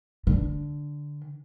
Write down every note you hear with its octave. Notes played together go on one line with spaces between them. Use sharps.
D3